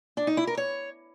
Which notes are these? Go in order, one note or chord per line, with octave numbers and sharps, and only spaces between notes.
D4
D#4
E4
A#4
C#5